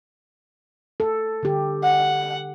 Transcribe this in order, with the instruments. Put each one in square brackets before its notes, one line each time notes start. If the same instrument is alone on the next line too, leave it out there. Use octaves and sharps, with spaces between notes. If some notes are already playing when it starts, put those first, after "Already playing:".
[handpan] A4
D3 G4
[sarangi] F#5